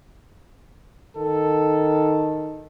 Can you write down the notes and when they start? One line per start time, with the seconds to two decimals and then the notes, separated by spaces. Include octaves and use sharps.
1.17 D#3 A4